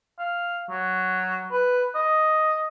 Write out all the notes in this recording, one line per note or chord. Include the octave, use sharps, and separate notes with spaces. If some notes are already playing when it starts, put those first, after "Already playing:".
F5
F#3
B4
D#5